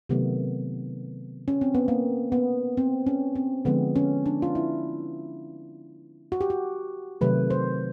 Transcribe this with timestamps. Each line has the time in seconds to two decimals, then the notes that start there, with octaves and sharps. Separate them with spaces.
0.09 C3 D#3 F#3 A3 B3
1.48 C#4
1.61 C4
1.75 B3
1.88 A#3
2.32 B3
2.77 C4
3.07 C#4
3.36 C4
3.65 D3 F3 G#3 B3
3.96 C#4
4.26 D4
4.42 F4
4.55 E4
6.32 F#4
6.41 G4
6.50 F#4
7.21 C3 D#3 F#3 A3 B4
7.50 C5